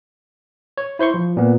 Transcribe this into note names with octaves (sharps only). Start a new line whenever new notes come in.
C#5
E4 C5 C6 C#6
F3
A#2 B3